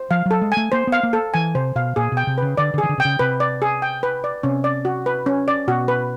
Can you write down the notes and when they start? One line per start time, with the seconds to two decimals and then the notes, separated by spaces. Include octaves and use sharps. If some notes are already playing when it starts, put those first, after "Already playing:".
Already playing: C5
0.11 F3 F5
0.26 F#3
0.31 A4
0.41 G#3
0.52 G#5
0.57 A3
0.72 A#3 C5
0.87 B3
0.92 F5
1.03 A#3
1.13 A4
1.34 E3 G#5
1.55 C3 C5
1.75 B2 F5
1.96 A#2 G#4
2.12 B2
2.17 G5
2.27 C3
2.38 C#3 B4
2.57 D3 D5
2.74 D3
2.78 G#4
2.83 D#3
2.89 D3
2.98 C3 G5
3.05 C#3
3.19 C3 B4
3.40 D5
3.62 G#4
3.82 G5
4.03 B4
4.24 D5
4.43 C3 C#4
4.64 D5
4.85 F#4
5.06 B4
5.26 C#4
5.48 D5
5.68 B2 F#4
5.88 B4